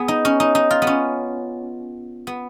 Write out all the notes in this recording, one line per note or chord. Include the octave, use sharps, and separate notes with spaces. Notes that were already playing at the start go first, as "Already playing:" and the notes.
Already playing: B3 G#4
D#4
C#4
D#4
D#4
F4
B3
C#4
B3